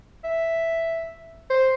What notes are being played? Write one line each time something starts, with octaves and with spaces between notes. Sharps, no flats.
E5
C5